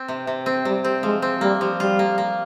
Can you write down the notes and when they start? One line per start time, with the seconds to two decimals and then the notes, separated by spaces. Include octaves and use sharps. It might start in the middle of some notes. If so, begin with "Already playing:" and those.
Already playing: C4
0.08 C3
0.27 C3
0.46 C4
0.65 C3 G3
0.84 C4
1.03 F3 G#3
1.22 C4
1.41 G3 A#3
1.61 F3
1.80 G3 F4
1.99 A#3
2.18 A#3